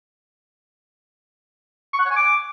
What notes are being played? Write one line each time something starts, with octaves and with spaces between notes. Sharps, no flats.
C#6
F#5
C#5
G#5
D6